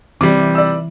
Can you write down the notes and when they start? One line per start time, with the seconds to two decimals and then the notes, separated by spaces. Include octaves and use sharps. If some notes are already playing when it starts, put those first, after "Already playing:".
0.21 C3 E3 G3 D6
0.55 D5 E6